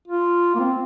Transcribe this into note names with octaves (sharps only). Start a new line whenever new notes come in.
F4
A#3
C4